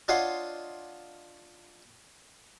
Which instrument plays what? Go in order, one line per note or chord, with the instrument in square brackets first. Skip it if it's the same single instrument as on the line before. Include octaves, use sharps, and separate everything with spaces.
[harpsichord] D4 F4 C#5 D#5 F#5 C6